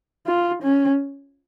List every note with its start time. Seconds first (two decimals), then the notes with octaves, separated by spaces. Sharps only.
0.26 F4
0.63 C#4